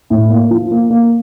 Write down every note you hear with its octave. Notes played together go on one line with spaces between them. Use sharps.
A2
A#3
F3
A#3
A#3